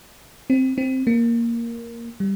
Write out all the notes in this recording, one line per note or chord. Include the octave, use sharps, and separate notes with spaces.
C4
C4
A#3
G3